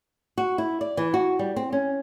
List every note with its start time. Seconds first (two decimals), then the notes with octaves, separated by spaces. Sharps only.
0.38 F#4
0.58 E4
0.81 D5
0.97 E3
1.14 F#4
1.39 G3
1.56 C4
1.73 C#4